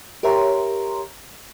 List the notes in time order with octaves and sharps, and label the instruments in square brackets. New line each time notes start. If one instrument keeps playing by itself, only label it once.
[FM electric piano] G4 A#4 C#5 E5 A#5 C6